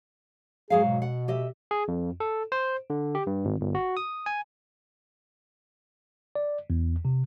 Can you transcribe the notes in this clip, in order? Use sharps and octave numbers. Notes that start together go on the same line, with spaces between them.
G#2 F#3 G#4 F5
B2
F#5
G4 D#5 E5
G#4
F2
A4
C5
D3
G4
G2
G#1
G1
F#4
D#6
G#5
D5
E2
C3